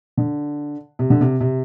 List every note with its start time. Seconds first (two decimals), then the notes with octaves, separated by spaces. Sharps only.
0.17 D3
0.99 C3
1.10 D3
1.21 C3
1.40 C3